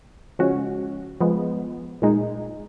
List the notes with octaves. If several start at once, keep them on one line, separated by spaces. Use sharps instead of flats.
C#3 F3 G#3 C#4 F#4
F3 G#3 B3
A#2 G#3 D#4